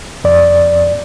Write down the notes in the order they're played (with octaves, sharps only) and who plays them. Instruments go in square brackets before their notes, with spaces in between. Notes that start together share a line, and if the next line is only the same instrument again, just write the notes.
[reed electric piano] F2 D5